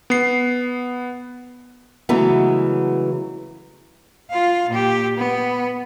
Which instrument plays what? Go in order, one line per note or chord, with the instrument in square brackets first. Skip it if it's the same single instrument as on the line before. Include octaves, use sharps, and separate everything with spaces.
[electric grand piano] B3 C7
[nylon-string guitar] C#3 E3 F#3 G#3 A3 B3
[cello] F4 F5
A#2 G4
B3